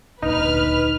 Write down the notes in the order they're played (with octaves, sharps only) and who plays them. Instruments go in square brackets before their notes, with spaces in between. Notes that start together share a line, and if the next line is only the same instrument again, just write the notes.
[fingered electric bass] D1 A#1 D4 [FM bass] D#4 [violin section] B4 F6